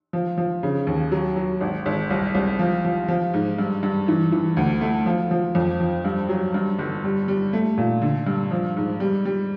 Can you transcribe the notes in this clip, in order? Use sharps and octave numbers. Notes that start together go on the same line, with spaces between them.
F3
F3
C#3
D#2
F#3
F#3
G#1
G#1
C2
C2
F3
F3
F3
G#2
G2
G2
E3
E3
D2
A3
F3
F3
F2
F3
G2
F#3
G2
G1
G3
G3
A3
A#2
D3
G2
F3
G#2
G3
G3